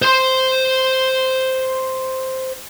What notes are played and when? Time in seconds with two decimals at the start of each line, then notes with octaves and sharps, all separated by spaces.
0.02 C5 C6